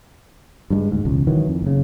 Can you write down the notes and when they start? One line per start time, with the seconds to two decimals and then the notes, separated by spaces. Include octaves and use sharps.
0.70 G2 G3 G#3
0.91 D2 G#2
1.05 E1 C#2
1.27 D#3 E3 F#3
1.48 F2
1.62 F#1 C#3